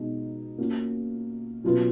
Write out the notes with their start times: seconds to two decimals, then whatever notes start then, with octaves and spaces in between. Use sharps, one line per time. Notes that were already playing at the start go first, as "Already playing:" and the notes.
Already playing: B2 G#3 D#4
0.58 A#3 C#4 F#4
1.64 B2 F#3 C#4 F4 B4